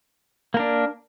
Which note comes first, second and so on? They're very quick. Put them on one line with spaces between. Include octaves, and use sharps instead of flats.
A#3 A#4 D4